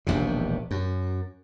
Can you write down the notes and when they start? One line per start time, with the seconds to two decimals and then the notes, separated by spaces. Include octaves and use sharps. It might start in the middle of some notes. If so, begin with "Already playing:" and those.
0.07 E1 A#1 D#2 C3
0.71 F#2